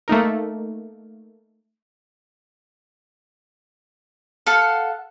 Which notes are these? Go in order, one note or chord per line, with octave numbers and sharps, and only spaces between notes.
A3 A#3 D#4 A#4
A4 F5 F#5